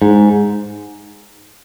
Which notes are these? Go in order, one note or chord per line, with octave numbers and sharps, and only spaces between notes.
G#2